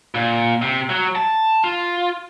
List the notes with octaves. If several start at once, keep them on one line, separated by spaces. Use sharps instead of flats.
A#2
C3
F#3
A5
F4